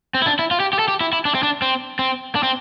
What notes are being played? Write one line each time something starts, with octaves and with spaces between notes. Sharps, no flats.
C4
E4
D4
E4
F4
G4
G4
A4
G4
E4
E4
D4
C4
D4
C4
C4
D4
C4